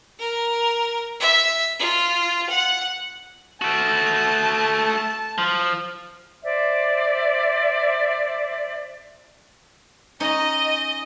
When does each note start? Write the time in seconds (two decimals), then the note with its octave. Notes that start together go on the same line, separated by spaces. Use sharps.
0.19 A#4
1.20 E5
1.79 F4
2.50 F#5
3.62 A3 F#4 A5
5.38 F3
6.44 C5 D5 E5
10.20 C#4 D#4 D#5